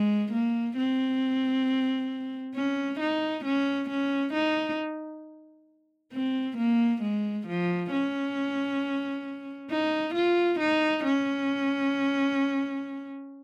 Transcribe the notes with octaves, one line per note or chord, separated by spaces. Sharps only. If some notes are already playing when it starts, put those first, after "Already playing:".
Already playing: G#3
A#3
C4
C#4
D#4
C#4
C#4
D#4
C4
A#3
G#3
F3
C#4
D#4
F4
D#4
C#4